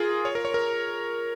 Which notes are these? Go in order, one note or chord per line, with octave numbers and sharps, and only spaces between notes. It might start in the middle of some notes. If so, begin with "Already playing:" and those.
Already playing: F4 G#4 A#4
C#5
A#4
C#5
A#4